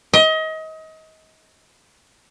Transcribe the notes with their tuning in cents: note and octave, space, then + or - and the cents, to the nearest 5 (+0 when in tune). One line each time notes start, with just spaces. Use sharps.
D#5 +30